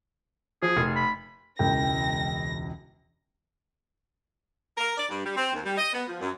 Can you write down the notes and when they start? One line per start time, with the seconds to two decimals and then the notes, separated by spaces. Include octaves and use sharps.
0.62 F3 G#4
0.77 F1
0.96 B5
1.59 E1 C#2 E3 G5 A#6
4.77 A#4
4.98 D5
5.09 G2
5.24 G3
5.36 C4
5.53 D#2
5.65 G3
5.77 D#5
5.93 B3
6.07 F3
6.21 F#2